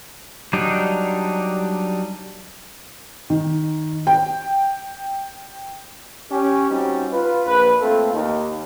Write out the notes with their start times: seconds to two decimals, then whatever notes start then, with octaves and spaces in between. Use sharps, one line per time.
0.53 F#3 G3 D4 D#4
3.30 D#3
4.07 G5
6.31 C#4 G4
6.70 G3 C4 C#4 D#4 F#4 G4
7.12 F4 B4
7.47 A#1 B4
7.81 A3 A#3 C4 F4 A4
8.13 D#2